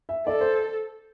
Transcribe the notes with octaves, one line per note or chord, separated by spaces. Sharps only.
E5
A4 D5
C5